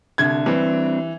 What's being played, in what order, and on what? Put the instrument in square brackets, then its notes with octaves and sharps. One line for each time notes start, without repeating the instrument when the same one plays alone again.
[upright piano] C2 D3 G#6
[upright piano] E3 [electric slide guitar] G3 C4 D4